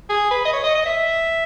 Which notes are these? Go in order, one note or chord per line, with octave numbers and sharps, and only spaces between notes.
G#4
B4
D#5
C#5
D#5
D#5
E5